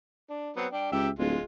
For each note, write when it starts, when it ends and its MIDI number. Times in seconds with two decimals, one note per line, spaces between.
0.30 0.51 62
0.56 0.66 54
0.56 0.66 59
0.56 0.66 60
0.72 0.89 62
0.72 0.89 79
0.92 1.10 37
0.92 1.08 67
0.92 1.08 76
0.92 1.08 79
1.19 1.37 26
1.19 1.42 56
1.19 1.42 65